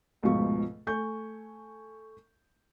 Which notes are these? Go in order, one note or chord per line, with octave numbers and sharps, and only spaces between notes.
F1 C#2 G#2 B2 F3 C#6
A3 G#5 C#6 G6